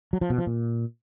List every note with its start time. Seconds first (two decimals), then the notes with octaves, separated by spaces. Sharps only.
0.13 F#3
0.21 F3
0.30 B2
0.38 F3
0.47 A#2